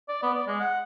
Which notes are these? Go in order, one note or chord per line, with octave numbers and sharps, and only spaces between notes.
D5
B3
D5
G#3
F#5